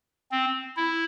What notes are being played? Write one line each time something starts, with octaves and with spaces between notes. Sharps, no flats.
C4
E4